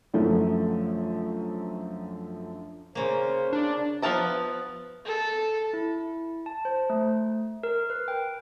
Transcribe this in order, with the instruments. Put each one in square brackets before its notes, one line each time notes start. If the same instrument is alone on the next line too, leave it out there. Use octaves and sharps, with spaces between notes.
[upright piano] F#2 D3 F3 F#3 A3
[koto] C#3 A#3 [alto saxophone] C5
[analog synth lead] D4
[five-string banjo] F3 B3 F5 A5 A#5
[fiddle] A4
[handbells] E4
A5
C5
A3
A#4
B4
G5